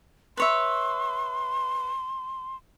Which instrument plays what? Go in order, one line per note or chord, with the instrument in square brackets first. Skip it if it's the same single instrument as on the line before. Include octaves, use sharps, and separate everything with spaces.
[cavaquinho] B4 C#5 E5 [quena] C6